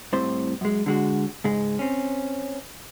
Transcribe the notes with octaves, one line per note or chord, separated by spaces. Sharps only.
C2 A2 C3 C5
F#2 G#3
D3 G#3 F#4
C#2 G#2 G#3
C4 C#4